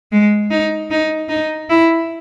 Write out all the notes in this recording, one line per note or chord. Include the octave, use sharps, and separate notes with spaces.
G#3
D#4
D#4
D#4
E4